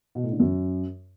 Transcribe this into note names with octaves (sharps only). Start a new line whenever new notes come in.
B2
A2
D3
F#2